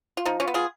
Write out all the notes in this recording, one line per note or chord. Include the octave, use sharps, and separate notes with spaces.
F4
F3 D#4
C#4 F4
B3
F4 G#4